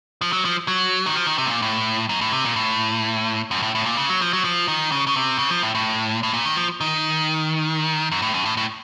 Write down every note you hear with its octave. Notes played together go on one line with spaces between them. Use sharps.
F3
F#3
F3
F#3
D#3
F3
D#3
C3
A2
A#2
A2
F#2
A2
C3
A#2
A2
F#2
A2
A2
A#2
C#3
F#3
F3
F#3
F3
D#3
C#3
C#3
C3
C#3
F3
A2
A2
A2
A#2
D#3
F3
D#3
F#2
A2
F#2
A2
A2